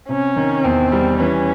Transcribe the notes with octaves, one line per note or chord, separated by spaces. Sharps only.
C3 C#4
D#3
E2 C4
G3
E3 C#4